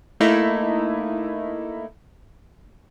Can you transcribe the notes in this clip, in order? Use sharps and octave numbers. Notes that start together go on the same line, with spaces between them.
A3 A#3 D#4 E4